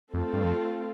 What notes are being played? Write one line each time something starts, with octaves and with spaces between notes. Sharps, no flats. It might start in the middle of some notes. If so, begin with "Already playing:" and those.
F2 A3 C4 F4 A4
G2
F2